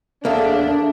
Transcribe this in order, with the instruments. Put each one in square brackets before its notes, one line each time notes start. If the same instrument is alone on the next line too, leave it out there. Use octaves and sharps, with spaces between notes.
[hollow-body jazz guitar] E2 C#3 A#3 [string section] D4 [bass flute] A4 [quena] E5